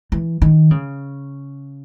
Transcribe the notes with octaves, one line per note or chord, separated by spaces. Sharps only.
E3
D#3
C#3